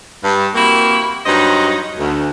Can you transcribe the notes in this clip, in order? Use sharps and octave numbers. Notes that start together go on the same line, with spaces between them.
G2
A#3 C4 E4 F#4 G4
G2 F#3 D#4 C5 D#5
D2